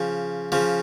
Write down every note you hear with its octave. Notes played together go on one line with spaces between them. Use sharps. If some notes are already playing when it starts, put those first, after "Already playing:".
Already playing: C#3 F3
C#3 F3